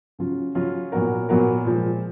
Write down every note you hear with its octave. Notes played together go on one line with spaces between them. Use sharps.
C#3 F#3 C#4 F4
C#3 F#3 C#4 F4
A#2 F#3 B3 F#4 A#4
A#2 F#3 B3 F#4 A#4
A#2 F3 G#3